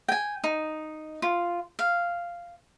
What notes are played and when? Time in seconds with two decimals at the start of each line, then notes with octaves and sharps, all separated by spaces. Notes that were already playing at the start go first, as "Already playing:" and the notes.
0.08 G5 G#5
0.44 D#4
1.22 F4
1.79 F5